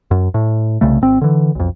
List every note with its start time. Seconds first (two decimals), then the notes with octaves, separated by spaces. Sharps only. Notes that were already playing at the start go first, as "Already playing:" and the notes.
0.11 F#2
0.34 A2
0.81 C2 C#3 A3
1.01 G#1 C4
1.21 D3 E3
1.55 B1 F2